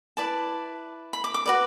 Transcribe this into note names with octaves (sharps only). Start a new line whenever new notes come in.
E4 B4 D5 A5
B5
D6
D6
F#4 B4 D5